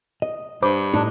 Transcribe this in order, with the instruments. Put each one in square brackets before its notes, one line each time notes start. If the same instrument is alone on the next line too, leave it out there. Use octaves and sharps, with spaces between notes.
[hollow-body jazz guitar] D#5
[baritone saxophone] G2 [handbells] C5 B5 D6
[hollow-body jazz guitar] A2 D#4 [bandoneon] D4